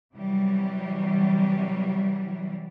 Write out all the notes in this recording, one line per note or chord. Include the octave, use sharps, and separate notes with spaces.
C3 E3 F#3 G3